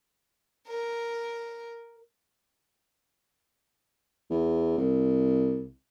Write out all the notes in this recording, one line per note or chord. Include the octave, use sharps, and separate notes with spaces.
A#4
E2
C2